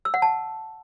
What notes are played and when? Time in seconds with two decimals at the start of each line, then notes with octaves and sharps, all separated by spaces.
0.05 E6
0.14 F#5
0.22 A5